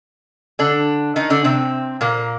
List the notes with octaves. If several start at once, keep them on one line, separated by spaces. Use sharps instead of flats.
D3 D4
D#3 D#4
D3 D4
C3 C4
A#2 A#3